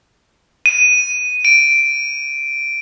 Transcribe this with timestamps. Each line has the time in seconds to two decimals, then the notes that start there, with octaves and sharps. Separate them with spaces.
0.66 D#7
1.45 D7